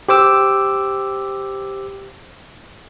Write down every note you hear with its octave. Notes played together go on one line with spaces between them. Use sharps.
G4 C5 D6 E6